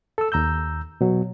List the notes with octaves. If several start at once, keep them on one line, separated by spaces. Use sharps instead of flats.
A4 E6
D#2 A#5 E6 G6
B2 F#3